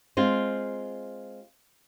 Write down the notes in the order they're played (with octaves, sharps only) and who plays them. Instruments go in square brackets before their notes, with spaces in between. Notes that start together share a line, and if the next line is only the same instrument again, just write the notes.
[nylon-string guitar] G#3 C4 F4